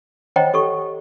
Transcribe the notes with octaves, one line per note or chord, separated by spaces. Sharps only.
C5 C#5 D#5 F#5 G5 A#5
G4 A4 C#6